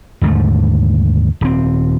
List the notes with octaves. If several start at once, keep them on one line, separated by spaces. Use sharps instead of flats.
D#2 G#2 D3 A3
D#1 C4